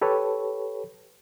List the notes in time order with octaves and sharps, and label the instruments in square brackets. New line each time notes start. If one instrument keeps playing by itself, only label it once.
[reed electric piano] G4 A4 B4 C#5